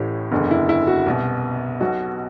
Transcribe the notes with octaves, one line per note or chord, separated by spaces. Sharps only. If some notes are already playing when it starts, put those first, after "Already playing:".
Already playing: A1 A2 E3 G4
F#1 E2 D3
E4
E4
F#4
C2 B2
B1 B2 F#4